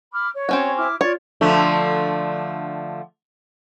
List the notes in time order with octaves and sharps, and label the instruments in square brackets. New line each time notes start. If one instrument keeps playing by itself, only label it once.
[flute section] B5 D6 F6
C#5
[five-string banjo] C4 C#4 F#4
[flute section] E4 D6 F6
[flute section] F4 D5 [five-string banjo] C#5
[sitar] D3 F3 A3